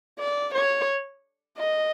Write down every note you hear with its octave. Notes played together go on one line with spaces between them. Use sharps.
D5
C#5
D#5